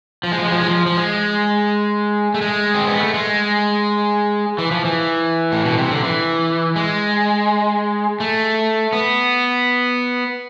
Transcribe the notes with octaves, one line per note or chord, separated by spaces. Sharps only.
F3
G#3
F3
G#3
F3
G#3
F3
F3
G#3
A3
G#3
C4
B3
A3
G#3
E3
F3
E3
A2
B2
C3
D3
E3
G#3
A3
B3